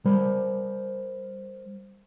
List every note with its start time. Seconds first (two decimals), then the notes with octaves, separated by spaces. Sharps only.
0.05 G3 A#4 C5 B5